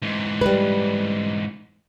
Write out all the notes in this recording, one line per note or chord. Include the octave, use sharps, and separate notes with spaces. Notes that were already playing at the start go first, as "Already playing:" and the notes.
G#2 E3
G3 B4